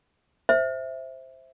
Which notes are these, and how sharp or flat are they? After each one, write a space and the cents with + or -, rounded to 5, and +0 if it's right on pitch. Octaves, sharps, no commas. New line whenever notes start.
C5 +0 E5 +0